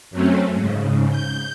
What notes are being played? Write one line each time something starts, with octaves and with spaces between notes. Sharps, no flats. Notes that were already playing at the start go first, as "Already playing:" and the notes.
F#2 F#3 A3 C4 C#4
G#2 C#3
G6